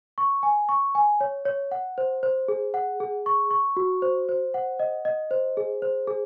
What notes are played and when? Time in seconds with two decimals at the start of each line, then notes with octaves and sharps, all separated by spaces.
0.18 C#6
0.43 G#5
0.69 C#6
0.95 G#5
1.21 C#5
1.45 C#5
1.72 F#5
1.98 C5
2.23 C5
2.48 G#4
2.74 F#5
3.00 G#4
3.26 C#6
3.51 C#6
3.77 F#4
4.02 C5
4.29 C5
4.54 F#5
4.80 D#5
5.05 D#5
5.31 C5
5.57 G#4
5.82 C5
6.07 G#4